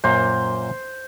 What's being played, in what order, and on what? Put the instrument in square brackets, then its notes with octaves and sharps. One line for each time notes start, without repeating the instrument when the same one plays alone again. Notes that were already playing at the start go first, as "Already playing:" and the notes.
[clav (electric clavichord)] F#2 A#2 A#3 [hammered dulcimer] C5